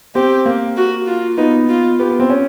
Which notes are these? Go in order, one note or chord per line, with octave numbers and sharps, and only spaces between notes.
C4 G4
A#3
F#4
F4
B3 D#4
F4
B3 G4
B3
C4
C#4